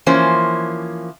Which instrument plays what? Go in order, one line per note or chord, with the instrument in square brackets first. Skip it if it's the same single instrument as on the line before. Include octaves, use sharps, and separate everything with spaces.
[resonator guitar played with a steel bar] E3 F3 A#3 C#4 C5